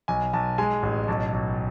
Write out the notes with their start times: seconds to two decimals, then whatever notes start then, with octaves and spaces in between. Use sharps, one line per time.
0.08 B1 G#5
0.33 B1 A5
0.58 G#3 G#5
0.83 A1
1.08 B1 A5
1.33 B1